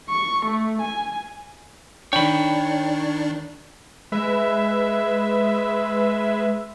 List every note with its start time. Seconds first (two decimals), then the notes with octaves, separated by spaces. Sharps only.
0.10 C#6
0.45 A3
0.81 G#5
2.13 D#3 D4 C#5 G5 B5
4.12 G#3 B4 E5